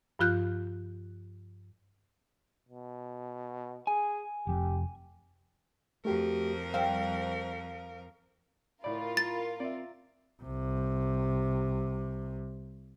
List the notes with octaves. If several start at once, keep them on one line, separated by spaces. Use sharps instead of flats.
G2 F3 F4 F#6 G6
B2
G#4 G#5
F1 F2 G4
F2 A3 F#4 G4 A#4
G3 C4 F5
A2 F4 A#4 D5 B5
A6
C4 D5 E5
C2 C3